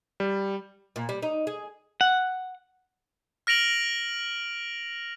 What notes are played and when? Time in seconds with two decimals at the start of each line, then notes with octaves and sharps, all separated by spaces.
0.20 G3
0.96 A#2
1.09 G3
1.22 D#4
1.47 G#4
2.01 F#5
3.47 F6 A#6 D7 F7 F#7